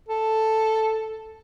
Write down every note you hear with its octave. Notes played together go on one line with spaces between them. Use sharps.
A4